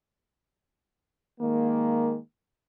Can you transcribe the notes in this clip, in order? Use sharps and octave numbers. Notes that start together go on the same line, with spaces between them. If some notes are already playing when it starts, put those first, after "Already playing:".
D#3 G#3 A#3